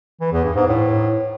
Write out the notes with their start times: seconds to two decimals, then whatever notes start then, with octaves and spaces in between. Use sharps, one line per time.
0.21 E3
0.32 E2
0.44 G2
0.56 G#2
0.67 A2